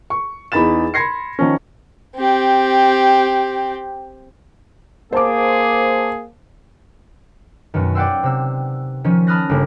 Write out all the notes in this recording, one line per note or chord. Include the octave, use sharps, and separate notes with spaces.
C#6
E2 D#4 G#4 B5 A6 E7
B5 C6 G#6 A#6 C7 C#7
D#3 F3 C#4
C4 G4
A#3 G#4 C5 A5 D6
F#2 B2 D#3
D5 E5 F#5 G5 C6 E6
C3 E6
D#3 F3 C#4
A5 B5 D#6 F6 F#6 A#6
G1 C#3 A#3